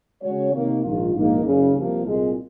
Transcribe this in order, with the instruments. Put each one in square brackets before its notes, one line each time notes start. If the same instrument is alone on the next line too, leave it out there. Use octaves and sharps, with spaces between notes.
[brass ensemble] C#3 G#3 C#4 F#4 C#5
C3 D#3 A#3
A#1 G#2 D#3 A#3 F4
A#1 G#2 D#3 A#3 D#4
F#1 F#2 C#3
C2 C3 F3 A#3
C2 A#2 G#3